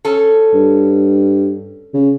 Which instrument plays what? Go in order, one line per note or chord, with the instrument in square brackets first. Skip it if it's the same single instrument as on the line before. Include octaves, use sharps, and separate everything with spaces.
[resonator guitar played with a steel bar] C#4 A4
[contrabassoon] G2
C#3